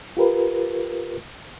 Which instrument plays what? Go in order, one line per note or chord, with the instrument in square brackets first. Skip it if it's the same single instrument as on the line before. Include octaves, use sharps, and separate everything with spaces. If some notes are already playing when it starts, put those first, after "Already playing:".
[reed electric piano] F4 G4 A#4 B4